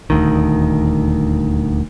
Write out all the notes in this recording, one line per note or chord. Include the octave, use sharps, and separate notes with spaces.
D#1 D2 D#3